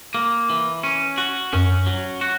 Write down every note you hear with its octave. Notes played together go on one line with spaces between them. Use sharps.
A#3
E3
C#4
F#4
F#2 C#4
F#3
F#4